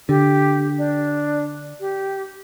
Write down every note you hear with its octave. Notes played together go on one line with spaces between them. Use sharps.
D3 G4
D4
G4